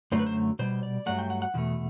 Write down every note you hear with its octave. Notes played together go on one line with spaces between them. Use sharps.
F#2 D3 F#3 A3 C5
B4
C5
B2 G3 C5
D5
G2 F#3 A3 F#5
G5
F#5
F#5
E2 B2 A3